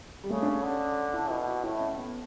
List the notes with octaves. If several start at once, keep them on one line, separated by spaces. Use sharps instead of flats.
G3
C#3 A3
D4
C#4
D3
E4
B2 E4
F#4
A2 E4
C#4
B3